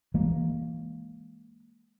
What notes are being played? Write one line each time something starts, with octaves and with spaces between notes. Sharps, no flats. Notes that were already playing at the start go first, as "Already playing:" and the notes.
E3 G#3 A#3